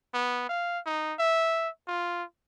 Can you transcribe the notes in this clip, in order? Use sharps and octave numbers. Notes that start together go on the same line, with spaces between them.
B3
F5
D#4
E5
F4